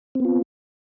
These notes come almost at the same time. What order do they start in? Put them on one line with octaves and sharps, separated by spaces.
C4 B3 F4